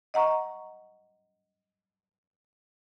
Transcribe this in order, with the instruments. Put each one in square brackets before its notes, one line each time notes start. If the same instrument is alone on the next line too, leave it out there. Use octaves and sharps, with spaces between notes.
[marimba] D#5 F#5 A#5 C#6